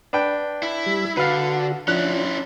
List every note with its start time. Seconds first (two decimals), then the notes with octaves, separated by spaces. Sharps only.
0.13 D4 B4 G5
0.63 E4
0.86 G3
1.17 D3 F#4 B4 F5
1.88 F3 C#4 D4 E4 F#6